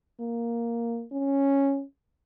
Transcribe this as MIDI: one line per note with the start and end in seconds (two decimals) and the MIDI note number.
0.20 1.04 58
1.12 1.83 61